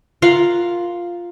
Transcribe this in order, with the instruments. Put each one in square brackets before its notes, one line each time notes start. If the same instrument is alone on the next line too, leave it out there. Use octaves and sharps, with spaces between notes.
[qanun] F4 A#4 F5 F#5